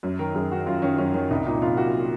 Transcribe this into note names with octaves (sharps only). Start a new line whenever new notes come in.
F#2
D#3 A#4
F#2 G#4
D#3 F#4
F#2 F4
D#3 C#4
F#2 C#4
D#3 C#4
C2 D#4
A#2 D#4
C2 F4
A#2 F#4